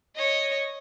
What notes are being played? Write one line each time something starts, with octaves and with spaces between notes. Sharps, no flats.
C#5 D#5